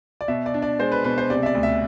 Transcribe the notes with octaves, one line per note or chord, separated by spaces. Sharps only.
D5
B2 E5
D5
D4
D5
G#3 C5
B4
B2 B4
C5
C3 D5
E5
D5
D2
E5